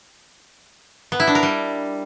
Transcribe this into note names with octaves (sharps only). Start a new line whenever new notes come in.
B3
E4
D4
A#4
G3